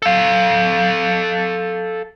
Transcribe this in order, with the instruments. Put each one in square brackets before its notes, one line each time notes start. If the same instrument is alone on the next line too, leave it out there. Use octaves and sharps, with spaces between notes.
[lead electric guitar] A4 F5